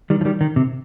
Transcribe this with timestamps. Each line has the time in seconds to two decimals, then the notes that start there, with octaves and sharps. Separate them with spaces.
0.10 D#3 G3
0.21 F3
0.25 D#3 G3
0.41 D#3
0.56 C3